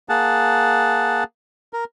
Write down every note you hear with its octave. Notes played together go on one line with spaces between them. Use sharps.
A#3 G#4 F#5 A5
A#4